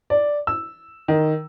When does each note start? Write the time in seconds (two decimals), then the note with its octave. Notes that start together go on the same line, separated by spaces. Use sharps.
0.10 D5
0.47 E6
1.08 D#3